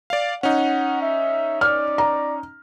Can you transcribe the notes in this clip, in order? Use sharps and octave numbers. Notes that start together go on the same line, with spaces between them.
D5 F5
C#4 D#4 F#5
E5
D5 F6
A#5